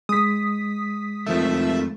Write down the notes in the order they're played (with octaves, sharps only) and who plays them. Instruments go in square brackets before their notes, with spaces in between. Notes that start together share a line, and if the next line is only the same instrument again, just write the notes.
[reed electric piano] G#3 [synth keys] D#6 B6
[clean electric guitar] F2 D#3 A3 [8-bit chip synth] F3 E5